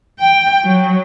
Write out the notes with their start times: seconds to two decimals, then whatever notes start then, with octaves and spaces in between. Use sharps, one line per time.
0.20 G5
0.64 F#3